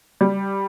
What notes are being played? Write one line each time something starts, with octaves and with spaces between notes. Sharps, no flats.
G3